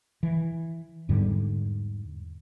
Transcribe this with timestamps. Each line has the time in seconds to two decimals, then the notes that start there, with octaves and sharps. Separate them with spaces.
0.23 E3
1.09 E2 G#2 D3 G3